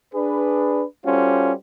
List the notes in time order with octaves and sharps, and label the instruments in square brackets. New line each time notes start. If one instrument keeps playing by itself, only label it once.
[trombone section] D4 G#4 B4
G3 C#4 F4 F#4 A4 C5